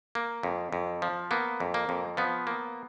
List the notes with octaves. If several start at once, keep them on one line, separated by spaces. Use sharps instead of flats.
A#3
F2
F2
F3
A#3 B3
F2
A#3
F2
F3 B3
A#3